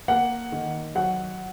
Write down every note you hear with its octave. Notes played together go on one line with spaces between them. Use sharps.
A#3 F#5
D#3
F#3 F#5